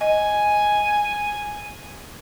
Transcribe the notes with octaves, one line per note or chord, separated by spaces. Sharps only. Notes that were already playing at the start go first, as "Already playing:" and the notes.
D#5 G#5